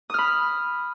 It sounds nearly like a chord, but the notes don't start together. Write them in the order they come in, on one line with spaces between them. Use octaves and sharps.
D#6 F6 B5